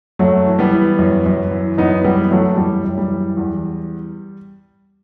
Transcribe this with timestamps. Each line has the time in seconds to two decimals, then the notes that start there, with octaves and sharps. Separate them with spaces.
0.19 F#2 F#3 A3
0.46 E3
0.59 G3 B3
0.72 E3
0.99 F#2
1.26 F#2
1.51 E3
1.78 F#2 B3 D#4
2.04 E3 G3 B3
2.31 E3 F#3 A3
2.57 F#2 G3
2.84 F#2
2.98 G3
3.11 E3
3.37 E2